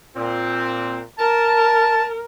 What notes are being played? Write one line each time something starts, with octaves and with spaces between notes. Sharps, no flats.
A#2 C4
A#4 A5